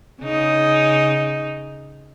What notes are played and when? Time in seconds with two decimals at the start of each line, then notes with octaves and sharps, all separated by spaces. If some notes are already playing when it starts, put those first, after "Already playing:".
0.22 C#3 D#4